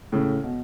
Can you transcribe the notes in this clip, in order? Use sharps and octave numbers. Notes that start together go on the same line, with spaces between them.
A2 C#3
B2